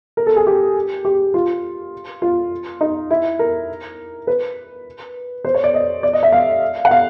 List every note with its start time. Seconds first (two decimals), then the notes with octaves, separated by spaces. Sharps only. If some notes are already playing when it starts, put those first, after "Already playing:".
0.17 A#4
0.26 A4
0.36 G#4
0.47 G4
1.05 G4
1.34 F4
2.22 F4
2.81 D#4
3.10 E4
3.39 A#4
4.27 B4
5.45 C5
5.54 C#5
5.64 D5
5.74 D#5
6.03 D5
6.13 D#5
6.23 E5
6.32 F5
6.85 F#5
6.91 F5